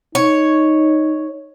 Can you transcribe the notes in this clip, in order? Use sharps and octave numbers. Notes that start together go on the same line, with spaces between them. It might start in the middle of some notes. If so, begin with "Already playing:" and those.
D#4 C#5